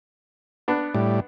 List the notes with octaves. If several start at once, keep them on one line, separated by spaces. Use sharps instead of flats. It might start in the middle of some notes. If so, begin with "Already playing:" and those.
B3 D4
A2 G3